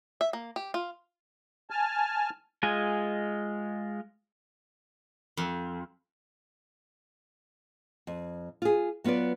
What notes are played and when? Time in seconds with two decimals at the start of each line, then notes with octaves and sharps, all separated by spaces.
0.21 E5
0.33 A#3
0.56 G4
0.74 F4
1.70 G#5 A5 F6
2.63 G#3 F4 D#5 G#5
5.37 F2
8.07 F2
8.62 F4 G#4
9.04 F#3 B3 F4 B4 D5